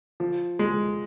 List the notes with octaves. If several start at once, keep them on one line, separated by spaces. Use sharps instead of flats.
F3
G#3